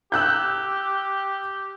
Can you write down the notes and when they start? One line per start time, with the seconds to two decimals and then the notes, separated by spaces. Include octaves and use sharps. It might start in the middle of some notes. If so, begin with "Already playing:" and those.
0.12 G4 E6 F#6 G6